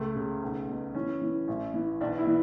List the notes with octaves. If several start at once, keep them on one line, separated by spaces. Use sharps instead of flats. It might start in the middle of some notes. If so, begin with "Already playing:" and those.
Already playing: C#2 A3
C#3
B1
B2
E3 C#4
E3
A1
E3
B1 D4
E4
E3